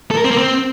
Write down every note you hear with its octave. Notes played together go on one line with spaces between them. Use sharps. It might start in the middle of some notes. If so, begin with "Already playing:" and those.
A4
A#4
C4
A#3
C4